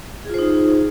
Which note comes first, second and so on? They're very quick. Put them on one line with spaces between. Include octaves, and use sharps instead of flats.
G#4 F4 C5 D#4